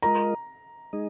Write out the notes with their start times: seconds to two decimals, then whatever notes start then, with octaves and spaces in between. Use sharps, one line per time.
0.02 G#3 F4 A#4 D#5 A#5
0.93 G#3 D#4 G#4 D#5